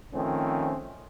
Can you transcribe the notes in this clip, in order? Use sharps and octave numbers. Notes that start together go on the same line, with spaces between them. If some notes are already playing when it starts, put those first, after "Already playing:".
D#3 F3 A3 C4 C#4